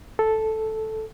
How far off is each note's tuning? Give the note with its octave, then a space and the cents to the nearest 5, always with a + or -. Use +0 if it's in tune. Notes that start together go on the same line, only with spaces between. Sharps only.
A4 -5